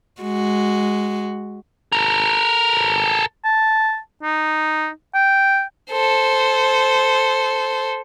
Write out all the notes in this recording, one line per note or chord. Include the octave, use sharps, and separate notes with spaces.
G#3 F#4
A4 A#4
A5
D#4
G5
A4 C5